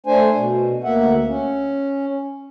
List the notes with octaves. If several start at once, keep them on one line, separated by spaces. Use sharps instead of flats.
A3 D4 C5 G#5
B2
D2 A#3 E5 F#5
C#4